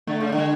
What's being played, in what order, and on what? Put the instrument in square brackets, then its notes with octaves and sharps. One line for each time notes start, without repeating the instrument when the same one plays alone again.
[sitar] D3 [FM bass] A3
[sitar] C#3
D3
[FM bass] G#3